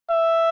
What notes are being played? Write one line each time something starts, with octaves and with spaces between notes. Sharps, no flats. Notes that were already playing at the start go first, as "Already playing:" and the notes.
E5